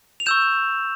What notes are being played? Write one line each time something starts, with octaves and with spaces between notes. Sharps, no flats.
F7
C#6 E6 G6 E7